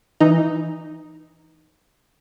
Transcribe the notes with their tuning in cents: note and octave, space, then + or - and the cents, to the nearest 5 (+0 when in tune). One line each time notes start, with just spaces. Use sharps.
E3 +0 D#4 +0